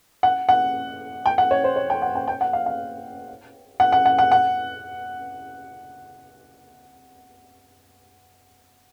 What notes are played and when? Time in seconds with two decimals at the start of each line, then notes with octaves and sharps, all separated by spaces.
0.23 F#5
0.49 F#5
1.26 G5
1.38 F#5
1.51 C#5
1.64 C5
1.76 C#5
1.90 G5
2.02 F#5
2.15 G5
2.28 G5
2.41 F#5
2.53 F5
2.66 F5
3.80 F#5
3.92 F#5
4.06 F#5
4.19 F#5
4.32 F#5